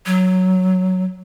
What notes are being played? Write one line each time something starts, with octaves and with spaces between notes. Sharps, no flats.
F#3